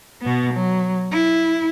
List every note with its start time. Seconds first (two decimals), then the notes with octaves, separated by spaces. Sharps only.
0.22 B2 B3
0.53 F#3
1.12 E4